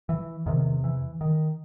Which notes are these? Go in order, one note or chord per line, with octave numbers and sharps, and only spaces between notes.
E3
E2 C3 D#3
E3
D#3